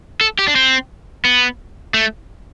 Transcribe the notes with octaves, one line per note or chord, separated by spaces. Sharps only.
A4
G4
D4
C4
B3
A3